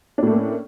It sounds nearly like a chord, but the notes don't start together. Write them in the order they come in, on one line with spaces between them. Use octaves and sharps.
D4 A2 A3 A#3 C#4